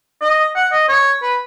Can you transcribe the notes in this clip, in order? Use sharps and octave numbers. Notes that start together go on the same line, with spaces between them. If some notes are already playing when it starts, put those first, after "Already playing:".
D#5
F#5
D#5
C#5
B4